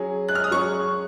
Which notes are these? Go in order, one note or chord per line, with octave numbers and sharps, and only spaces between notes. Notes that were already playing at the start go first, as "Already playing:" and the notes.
Already playing: F#3 C#4 G#4
F#6
F6
D#6
F#3 C#4 G#4 C#6